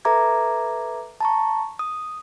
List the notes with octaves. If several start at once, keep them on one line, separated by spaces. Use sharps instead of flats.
A4 B4 E5 A#5 D6 G#6
A5 A#5 C#6
D#6